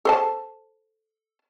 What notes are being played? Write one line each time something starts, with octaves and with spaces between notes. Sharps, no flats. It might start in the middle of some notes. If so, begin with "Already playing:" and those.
A4 C5 A5